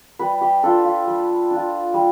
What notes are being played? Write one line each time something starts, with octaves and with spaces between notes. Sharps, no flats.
G3 B4
G4
D4 F4 A4
F4
G3
D4
F4
G3